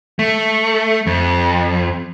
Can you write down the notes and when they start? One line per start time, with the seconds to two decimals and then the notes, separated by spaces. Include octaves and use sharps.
0.19 A3
1.07 F2